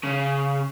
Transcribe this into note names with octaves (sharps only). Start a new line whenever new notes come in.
C#3